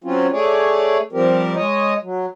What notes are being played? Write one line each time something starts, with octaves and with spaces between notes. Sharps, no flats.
F#3 C4 C#4 F4
A3 G#4 C#5 D5
F3 G3 C4 G4 A#4
G#3 C#5 D#5
F#3